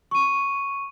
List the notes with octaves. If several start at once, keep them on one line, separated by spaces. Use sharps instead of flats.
C#6 D#7